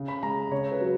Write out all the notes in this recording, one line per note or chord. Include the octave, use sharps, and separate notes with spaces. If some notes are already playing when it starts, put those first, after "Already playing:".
Already playing: C#3
B5
G#3 A#5
C#3 C#5
B4
F#3